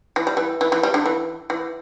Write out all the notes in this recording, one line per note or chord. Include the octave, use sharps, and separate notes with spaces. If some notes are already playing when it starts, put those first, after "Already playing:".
E3
G3
E3
E3
E3
G3
D3
E3
E3